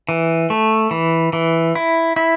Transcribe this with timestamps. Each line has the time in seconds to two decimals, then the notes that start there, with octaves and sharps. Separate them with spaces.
0.09 E3
0.50 A3
0.91 E3
1.33 E3
1.75 E4
2.16 E4